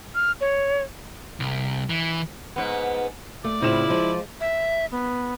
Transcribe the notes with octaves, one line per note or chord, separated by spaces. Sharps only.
F6
C#5
C2
E3
G#2 B3
A3 D5
A2 C#3 C4 E4 F4 E7
F3 G#3
E5
B3